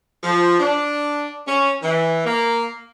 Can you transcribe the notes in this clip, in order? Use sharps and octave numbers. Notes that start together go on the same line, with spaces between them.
F3
D4
C#4
E3
A#3